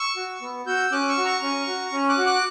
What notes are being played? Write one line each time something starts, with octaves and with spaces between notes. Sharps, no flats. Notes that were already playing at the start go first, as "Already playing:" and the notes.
Already playing: C#6 E6
F#4
B3
F#4 E6 G6
C#4 D6 F#6
C#6 E6
F#4
A#5 C#6
C#4
F#4
C#4
D6 F#6
F#4
D6 F#6